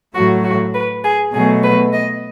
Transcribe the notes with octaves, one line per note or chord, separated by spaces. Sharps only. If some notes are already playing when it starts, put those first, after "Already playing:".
A2 F#3 A3 F#4
F#4
B4
G#4
B2 F#3 A3 G#4
B4
D#5